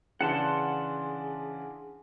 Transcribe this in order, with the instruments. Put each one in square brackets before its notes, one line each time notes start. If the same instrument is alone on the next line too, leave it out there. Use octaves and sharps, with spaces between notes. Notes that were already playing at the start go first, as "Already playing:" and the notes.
[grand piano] C#3 E3 D4 [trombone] G#4 [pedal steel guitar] F#5 A5 C6